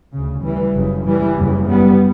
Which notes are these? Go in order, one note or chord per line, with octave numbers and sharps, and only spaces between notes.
D2 C#3
E3 G3
F#1 F#2 C#3
E3 G3
F#1 E2 C#3
G3 B3